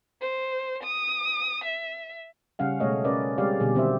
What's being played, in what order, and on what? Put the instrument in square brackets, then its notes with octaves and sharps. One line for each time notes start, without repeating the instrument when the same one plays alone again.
[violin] C5
D#6
E5
[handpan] C#3 G3 C#4 F5 F#5
B2 G#3 A3 C#5 D#5 F5
C#4 A#4 B4 D5 D#5
G3 G#3 C4 G4 D5 F5
B2 D3 G3 G#4
D3 D#3 C4 G4 C5 E5